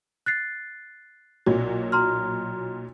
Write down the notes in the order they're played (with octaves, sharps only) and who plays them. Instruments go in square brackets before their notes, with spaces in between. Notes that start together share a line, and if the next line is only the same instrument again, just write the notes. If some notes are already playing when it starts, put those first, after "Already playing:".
[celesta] F#6 A6 C7
[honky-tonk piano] B1 A#2 F#3
[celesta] A#5 C6 F6